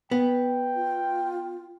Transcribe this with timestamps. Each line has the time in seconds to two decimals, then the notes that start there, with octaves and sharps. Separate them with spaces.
0.11 B3 G5
0.75 F4